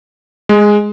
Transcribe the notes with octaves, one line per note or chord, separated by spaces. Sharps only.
G#3